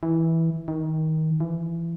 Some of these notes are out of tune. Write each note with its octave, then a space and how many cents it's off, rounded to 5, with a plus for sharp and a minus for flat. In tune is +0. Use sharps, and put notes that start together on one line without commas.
E3 -10
D#3 +20
E3 +25